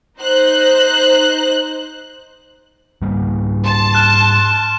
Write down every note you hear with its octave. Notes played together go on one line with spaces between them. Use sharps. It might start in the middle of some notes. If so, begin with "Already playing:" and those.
D#4 C5 F#6
G#2 G3 A#3
A5 C6
F6 F#6 E7